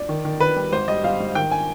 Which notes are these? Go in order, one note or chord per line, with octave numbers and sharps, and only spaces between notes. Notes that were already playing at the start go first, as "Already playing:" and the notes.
Already playing: D5
D#3
D#3
D#3 B4
G3
G#1 C5
G3 D#5
G3 F5
G#1
D#3 G5
G#5